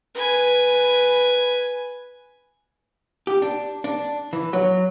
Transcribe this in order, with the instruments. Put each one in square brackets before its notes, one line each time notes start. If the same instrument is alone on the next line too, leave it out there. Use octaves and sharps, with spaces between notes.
[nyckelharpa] B4 G#5
[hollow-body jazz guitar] G4
D4
D4
E3
F#3